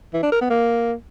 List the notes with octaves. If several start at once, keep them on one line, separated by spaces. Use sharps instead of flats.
E3
D4
A#4
B3
A#3